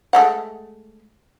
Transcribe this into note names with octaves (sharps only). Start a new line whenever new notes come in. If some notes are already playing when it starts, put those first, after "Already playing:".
G#3 A3 F#5